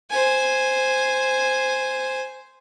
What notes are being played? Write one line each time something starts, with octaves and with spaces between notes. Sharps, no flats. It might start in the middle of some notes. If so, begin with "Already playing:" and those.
C5 G#5